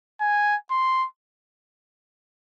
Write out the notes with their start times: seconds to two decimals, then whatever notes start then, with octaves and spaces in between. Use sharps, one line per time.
0.20 G#5
0.71 C6